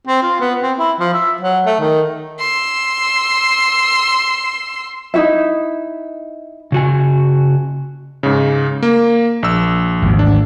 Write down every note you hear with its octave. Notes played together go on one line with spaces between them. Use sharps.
C4
F4
B3
C4
E4
F3
E5
F#3
A3
D#3
C6 E6
D#4 E4 F#4 E5
C#3 F#4 G#5
G#2 C#3
A#3
A#1 E6
G#1 D2
D4